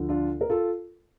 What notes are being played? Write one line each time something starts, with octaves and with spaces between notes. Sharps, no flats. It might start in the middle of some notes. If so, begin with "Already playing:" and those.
Already playing: D2 D3 F3
D4 F4
A#4
F4 A4